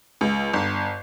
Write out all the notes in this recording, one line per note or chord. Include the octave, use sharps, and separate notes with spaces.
C#2
G1